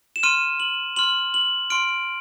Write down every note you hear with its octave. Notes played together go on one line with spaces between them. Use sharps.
E7
C6 F6 D#7
F#7
C6 F6 F#7
F#7
C6 F6 D7